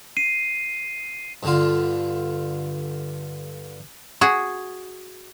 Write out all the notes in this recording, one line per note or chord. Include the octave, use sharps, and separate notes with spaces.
C7 D#7
G2 D3 F4
F#4 G#4